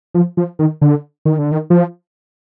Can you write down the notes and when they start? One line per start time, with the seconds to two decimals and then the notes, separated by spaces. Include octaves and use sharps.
0.14 F3
0.37 F3
0.59 D#3
0.81 D3
1.25 D#3
1.39 D3
1.52 D#3
1.70 F3